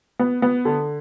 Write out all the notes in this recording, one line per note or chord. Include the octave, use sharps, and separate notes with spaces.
B3
B3
D3